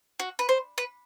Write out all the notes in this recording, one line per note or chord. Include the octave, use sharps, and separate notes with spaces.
F#4
B4
C5
B4